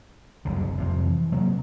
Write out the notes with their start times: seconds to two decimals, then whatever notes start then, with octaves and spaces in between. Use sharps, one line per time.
0.45 F#1 C2 D3
0.78 F2 C3 F3
1.05 E3
1.32 C3 F#3 A#3